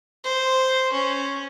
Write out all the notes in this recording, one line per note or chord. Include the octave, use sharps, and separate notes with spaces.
C5
C#4